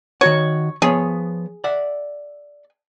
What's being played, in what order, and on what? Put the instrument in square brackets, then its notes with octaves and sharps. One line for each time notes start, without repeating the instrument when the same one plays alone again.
[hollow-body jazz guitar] D#3 F#4 F#5 [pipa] C#5
[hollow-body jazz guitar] F3 B3 C#5 [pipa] G#4
[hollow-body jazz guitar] D5 E5 F#5